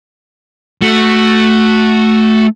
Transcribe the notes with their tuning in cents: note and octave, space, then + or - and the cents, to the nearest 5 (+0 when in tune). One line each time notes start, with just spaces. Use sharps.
A3 +0 F#4 +0